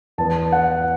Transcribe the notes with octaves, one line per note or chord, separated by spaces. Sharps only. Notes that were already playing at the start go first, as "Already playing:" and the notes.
E2 E3 B3 A5
F#5